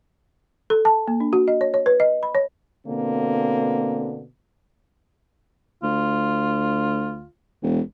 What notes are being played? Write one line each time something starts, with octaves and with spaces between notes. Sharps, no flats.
A4
A5
A#3
D4
F#4
D#5
C#5
C#5
B4
D#5
B5
C#5
B2 D3 A#3 C4
D2 F4
E1